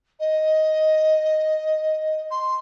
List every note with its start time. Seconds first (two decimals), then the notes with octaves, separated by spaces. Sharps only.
0.20 D#5
2.31 C6